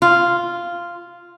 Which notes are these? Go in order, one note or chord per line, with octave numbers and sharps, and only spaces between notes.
F4